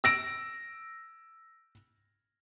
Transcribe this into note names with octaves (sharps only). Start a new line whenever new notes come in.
E6 A#6 D7